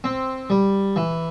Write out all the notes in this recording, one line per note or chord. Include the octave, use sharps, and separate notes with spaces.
C4
G3
E3